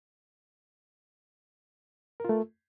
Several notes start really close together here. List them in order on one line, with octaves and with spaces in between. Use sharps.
A#4 F4 A3